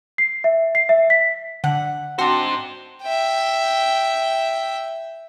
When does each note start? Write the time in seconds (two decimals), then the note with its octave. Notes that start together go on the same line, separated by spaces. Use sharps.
0.18 C7
0.44 E5
0.75 C7
0.89 E5
1.10 B6
1.64 D3 F#5
2.19 C4 D4 D#4 F#4 C5
3.03 E5 G5